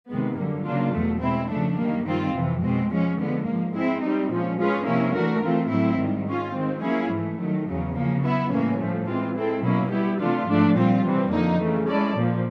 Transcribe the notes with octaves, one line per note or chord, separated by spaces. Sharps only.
C3 D#3 G#3 B3
F#2 D3 G3 A#3
C#3 F#3 A#3 D4 F4
E2 B2 F#3 A3
B2 G#3 C4 E4
C#3 F3 A3 D4
F#2 D#3 G3 A#3
G2 D#3 G3 C4 F4
F2 C3 E3
B2 G#3 C4
F3 G#3 C#4
D3 F3 G#3 B3
G#2 F3 A#3
G#3 C4 E4
G3 C4 D#4
A#2 F3 G#3 C#4
G#3 C#4 F4 G#4 B4
C3 F3 A#3 C#4 E4
E3 A3 D4 F#4 A#4
E3 A3 C4 F4
A2 F#3 A3 C4 E4
G#2 D#3 G3
G#3 C#4 F4
D#3 G#3 C4
F#3 A#3 C#4 E4 G#4
G#2 E3 A3
D#3 F#3 A3
E2 C#3 F#3
C#3 F3 A#3
F#3 B3 E4
A2 E3 G3 A#3 C#4
A2 F3 A3
E3 G#3 C4 F4
G#3 C4 E4 A4
B2 F#3 A#3 C#4 E4
G3 B3 E4 G4
C3 E3 A3 D4 F4
G#2 F3 A3 D4
A#2 G3 C4 F4
C3 E3 G3 C4
F2 D3 F3 A#3 D#4
C#3 E3 A3
G#3 C#4 E4 A4 D5
A#2 F3 A#3